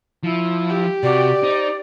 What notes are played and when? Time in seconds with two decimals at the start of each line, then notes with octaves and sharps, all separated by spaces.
0.24 F3 E4
0.69 G4
1.03 C3 F#4 D5
1.43 D#4 C5